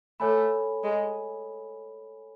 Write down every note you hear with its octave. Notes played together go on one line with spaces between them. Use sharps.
A3 A4 C#5 G#5 B5
G#3